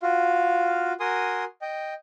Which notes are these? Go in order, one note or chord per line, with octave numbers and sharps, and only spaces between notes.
F4 F#4 F5
F#4 A#4 G#5 C6 D#6
D#5 G5